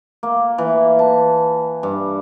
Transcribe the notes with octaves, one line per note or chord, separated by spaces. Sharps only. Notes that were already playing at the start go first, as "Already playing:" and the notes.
A#3
E3
A5
G2